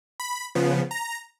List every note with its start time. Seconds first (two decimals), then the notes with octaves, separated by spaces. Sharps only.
0.20 B5
0.55 C#3 F3 B3
0.91 A#5